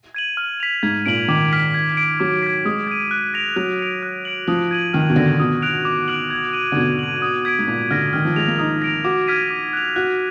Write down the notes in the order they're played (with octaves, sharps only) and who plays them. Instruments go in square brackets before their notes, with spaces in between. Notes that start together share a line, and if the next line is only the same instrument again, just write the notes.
[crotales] G#6 D#7 F#7
F6
B6 F7
[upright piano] G#2 [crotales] G#6
[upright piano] A#2 [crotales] D7 F#7
[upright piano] D#3 [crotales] D6
[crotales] F6 B6 D7 F#7
G#6
B6 D7
[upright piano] F#3 [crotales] D6
[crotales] G#6 B6
[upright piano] G#3 [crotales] D#6
[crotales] G#6 D#7
F#6
A#6 D7 F7
[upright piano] F#3 [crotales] F#6
[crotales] D7 F7
F#6
D7 F#7
[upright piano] F3 [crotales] D#6
[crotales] G#6 D#7 F#7
[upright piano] D#3 [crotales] F6
[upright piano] B2
[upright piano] D3 [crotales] A#6 D#7
[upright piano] B2 [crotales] D#6
[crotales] F#6 D7 F7
D6
F#6 D7 F#7
G#6
D#7 F#7
[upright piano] D3
[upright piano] B2 [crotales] G#6
[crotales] D#7 F#7
D#6
G#6 B6 D7
[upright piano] G#2
[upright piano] A#2 [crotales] D6
[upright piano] D3 [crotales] F6 A#6
[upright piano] D#3 [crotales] F6
[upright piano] F3
[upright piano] G#3 [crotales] A#6 F7
[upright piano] A#3
[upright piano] D#4 [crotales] D#6
[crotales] A#6 D7 F7
[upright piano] F#4 [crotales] D6
[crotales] F6 G#6 B6 D#7
D6
F#6 D7 F7
[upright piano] F#4 [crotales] F#6